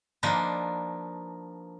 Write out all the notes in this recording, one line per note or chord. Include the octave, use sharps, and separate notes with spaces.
F3 A#3 D4 D#4 B4